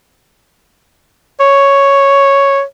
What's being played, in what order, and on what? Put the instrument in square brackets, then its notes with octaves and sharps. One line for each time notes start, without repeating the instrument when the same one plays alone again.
[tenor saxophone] C#5